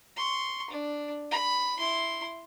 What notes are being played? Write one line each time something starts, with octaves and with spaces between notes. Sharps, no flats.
C6 C#6
D4
B5
E4 C6